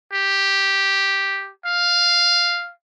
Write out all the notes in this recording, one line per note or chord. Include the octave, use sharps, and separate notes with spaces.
G4
F5